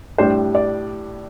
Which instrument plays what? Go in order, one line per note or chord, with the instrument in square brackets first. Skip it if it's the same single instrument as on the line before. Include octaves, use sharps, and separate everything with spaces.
[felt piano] A2 G3 D4 C5
D5